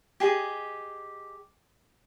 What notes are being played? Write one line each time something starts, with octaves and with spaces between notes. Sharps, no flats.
G4 G#4 D#5